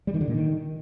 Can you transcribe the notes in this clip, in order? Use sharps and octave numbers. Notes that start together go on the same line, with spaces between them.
G3
D#3
D3
A#2
D#3